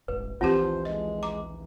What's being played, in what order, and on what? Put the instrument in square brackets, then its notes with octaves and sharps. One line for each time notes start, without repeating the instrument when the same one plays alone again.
[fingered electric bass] D#1 G#1 [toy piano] B4
[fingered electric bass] A#1 D#2 E3 [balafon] C4 G4 [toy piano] F4 A5 [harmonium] C5
[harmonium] G#3 [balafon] D#5
[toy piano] A#5 [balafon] D6